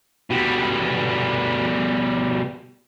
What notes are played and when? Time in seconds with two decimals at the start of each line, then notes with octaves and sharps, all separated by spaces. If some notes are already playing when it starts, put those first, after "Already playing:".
0.30 B2 G3